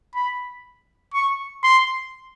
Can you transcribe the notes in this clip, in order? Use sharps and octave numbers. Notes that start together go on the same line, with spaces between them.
B5
C#6
C6